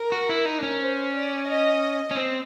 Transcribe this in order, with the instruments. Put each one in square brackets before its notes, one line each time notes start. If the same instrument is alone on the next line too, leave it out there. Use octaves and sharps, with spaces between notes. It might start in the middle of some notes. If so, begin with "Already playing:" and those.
Already playing: [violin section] A#4
[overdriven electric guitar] F#4
E4
D#4
D4
C#4
[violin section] C5
D5
D#5
[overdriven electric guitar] C#4
C4